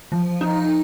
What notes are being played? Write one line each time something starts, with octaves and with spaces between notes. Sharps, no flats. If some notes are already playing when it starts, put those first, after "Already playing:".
F3
D#4